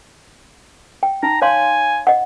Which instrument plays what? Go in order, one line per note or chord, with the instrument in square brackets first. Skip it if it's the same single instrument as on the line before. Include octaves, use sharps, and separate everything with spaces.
[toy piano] G5
[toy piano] D#4 [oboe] A#5
[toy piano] C#5 F5 C6 [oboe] G#5
[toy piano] D#5 F#5